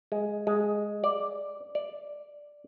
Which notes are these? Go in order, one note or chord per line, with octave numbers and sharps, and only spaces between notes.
G#3
G#3
D5
D5